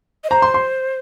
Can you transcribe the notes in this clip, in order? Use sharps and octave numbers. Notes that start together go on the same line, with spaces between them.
D#5
C5 A#5
C6
C6